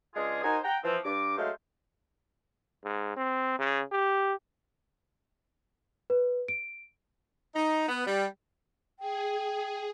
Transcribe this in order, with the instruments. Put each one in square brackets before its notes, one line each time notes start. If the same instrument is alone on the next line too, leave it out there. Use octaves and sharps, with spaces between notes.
[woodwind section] C#2 G#3 D4 F4 G#4
D#4 F#4 A#4 C5 G#5
F#5 G5 A#5
E3 F3 C4
G2 D6
F#3 G#3 A3 D#4 C5 F5
[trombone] G#2
C4
C#3
G4
[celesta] B4
D7
[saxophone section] D#4
B3
G3
[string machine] G#4 [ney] G5